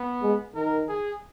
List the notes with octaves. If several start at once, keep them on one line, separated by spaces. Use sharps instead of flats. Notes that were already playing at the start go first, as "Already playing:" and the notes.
Already playing: B3
G#3
D#3 A#4
G#4